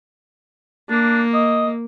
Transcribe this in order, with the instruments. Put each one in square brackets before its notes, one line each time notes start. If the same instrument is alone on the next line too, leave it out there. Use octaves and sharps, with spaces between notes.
[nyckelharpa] A#3 [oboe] D4
[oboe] D#5